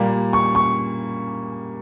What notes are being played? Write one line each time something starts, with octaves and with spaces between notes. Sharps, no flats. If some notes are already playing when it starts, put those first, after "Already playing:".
Already playing: A#2 G3 A#3 A#5
C#6
C#6